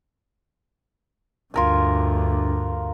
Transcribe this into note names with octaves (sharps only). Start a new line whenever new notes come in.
D2 G2 F4 A#4 G#5